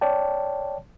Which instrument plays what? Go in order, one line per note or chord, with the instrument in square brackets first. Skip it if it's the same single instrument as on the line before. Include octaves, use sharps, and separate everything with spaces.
[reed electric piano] C#5 D5 G5 A5